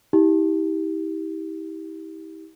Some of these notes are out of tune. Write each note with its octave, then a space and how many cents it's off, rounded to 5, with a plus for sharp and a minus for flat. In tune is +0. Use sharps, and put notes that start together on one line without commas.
E4 -45 G4 +0